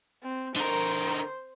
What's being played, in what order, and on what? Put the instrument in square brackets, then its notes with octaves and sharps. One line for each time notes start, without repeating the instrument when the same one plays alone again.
[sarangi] C4
[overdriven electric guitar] D3 A#4 [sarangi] C5